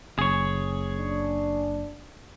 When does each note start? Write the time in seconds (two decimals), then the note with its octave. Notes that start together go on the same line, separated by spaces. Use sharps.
0.19 F#1 G#4 C#5
0.99 D4